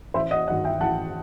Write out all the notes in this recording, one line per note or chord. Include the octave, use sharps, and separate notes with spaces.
A1 C5 E5
D#5 F#5
G2 D#3 F#3 D#5 F#5
E5 G5
A1 F#5 A5